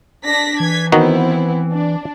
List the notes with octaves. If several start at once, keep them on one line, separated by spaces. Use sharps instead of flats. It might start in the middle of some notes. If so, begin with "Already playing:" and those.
D4 A#6 B6
E3 G#6 B6
D#3 B3 C4 D#4 E4 F#4
D4